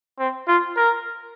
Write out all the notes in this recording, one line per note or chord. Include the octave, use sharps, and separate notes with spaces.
C4
F4
A#4